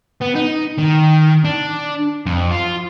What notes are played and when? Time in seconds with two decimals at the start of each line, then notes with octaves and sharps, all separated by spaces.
0.22 B3
0.36 D#4
0.78 D#3
1.45 D4
2.26 F2
2.51 F4